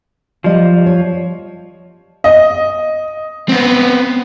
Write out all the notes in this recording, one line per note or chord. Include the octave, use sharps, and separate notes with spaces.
F3 G3 D#5
C#5
D#5
B3 C4